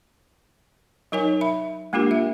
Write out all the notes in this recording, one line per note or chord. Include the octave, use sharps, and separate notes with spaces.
F#3 D#4 A#4 C#5 G#5
E5 B5
G#3 A#3 D4 F4 G4 A#4
E5